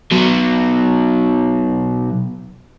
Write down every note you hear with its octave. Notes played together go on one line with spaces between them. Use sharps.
B2 F#3